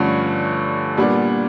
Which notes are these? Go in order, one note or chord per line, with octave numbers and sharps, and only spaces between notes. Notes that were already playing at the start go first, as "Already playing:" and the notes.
Already playing: G2 D3 F3 A3 C#4
A#2 G3 B3 D4